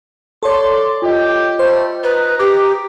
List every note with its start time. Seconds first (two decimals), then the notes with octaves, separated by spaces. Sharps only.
0.43 A4 C#5 D5 C6
1.02 F4 G4 D#5
1.59 G3 A3 C5
2.04 D#4 B4 A#5
2.39 G4 D6